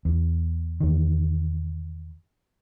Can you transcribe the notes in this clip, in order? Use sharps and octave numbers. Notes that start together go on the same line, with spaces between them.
E2
E2 D#3